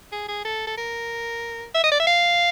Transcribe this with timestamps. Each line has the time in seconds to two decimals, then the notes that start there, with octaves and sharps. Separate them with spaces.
0.12 G#4
0.28 G#4
0.45 A4
0.67 A4
0.77 A#4
1.74 E5
1.83 D#5
1.91 D5
2.00 E5
2.07 F5